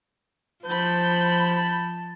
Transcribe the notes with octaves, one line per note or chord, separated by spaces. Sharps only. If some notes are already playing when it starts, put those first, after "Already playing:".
F3 C5 A5 B5 G6